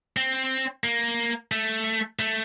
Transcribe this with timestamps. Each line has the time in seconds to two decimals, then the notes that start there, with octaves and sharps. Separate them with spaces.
0.17 C4
0.84 A#3
1.52 A3
2.19 A3